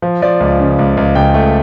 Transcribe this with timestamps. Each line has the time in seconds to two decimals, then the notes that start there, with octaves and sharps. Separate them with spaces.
0.02 F3
0.22 F3 D5
0.40 C#2
0.60 C#3
0.79 C#2
0.97 C#2
1.15 C#2 G5
1.34 A3